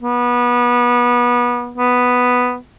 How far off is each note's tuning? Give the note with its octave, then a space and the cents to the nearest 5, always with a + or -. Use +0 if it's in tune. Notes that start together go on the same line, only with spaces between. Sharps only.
B3 -25
B3 +0